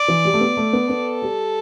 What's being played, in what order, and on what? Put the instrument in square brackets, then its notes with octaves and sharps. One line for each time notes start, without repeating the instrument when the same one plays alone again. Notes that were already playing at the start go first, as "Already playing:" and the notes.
Already playing: [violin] D5
[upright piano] E3
G3
A3
B3
A3
B3
[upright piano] B3 [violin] A4
[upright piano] G3